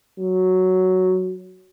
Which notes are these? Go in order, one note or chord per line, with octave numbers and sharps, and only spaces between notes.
F#3